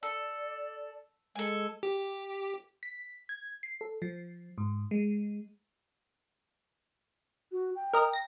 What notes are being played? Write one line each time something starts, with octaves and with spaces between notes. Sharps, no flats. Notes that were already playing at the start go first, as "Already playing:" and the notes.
A4 D5
G#3 A4 G#5
G4
B6
G#6
C7
A4
F3
G#2
G#3
F#4
G5
A#4 D#5
A#6